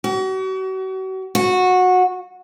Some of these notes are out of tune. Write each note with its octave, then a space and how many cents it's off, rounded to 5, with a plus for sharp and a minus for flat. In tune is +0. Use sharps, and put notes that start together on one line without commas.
F#4 +40
F#4 -15